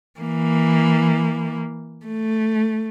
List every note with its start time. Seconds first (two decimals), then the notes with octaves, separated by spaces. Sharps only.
0.20 E3 A#3
2.06 A3